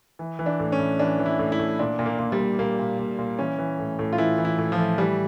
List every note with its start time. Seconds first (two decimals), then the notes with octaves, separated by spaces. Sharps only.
0.19 E3
0.39 E3
0.46 D4
0.60 A2
0.72 C#4
0.79 A2
0.99 E3 D4
1.19 E3
1.26 E4
1.39 A2
1.52 E4
1.59 A2
1.79 A#2 D4
1.99 A#2
2.06 A#3
2.19 A#2
2.32 G3
2.39 A#2
2.59 A#2 A#3
2.79 A#2
2.99 A#2
3.18 A#2
3.39 E3 C#4
3.59 E3
3.79 A2
3.99 A2
4.13 F4
4.18 E3 E4
4.38 E3
4.45 E4
4.58 A2
4.72 F3
4.78 A2
4.98 E3 G3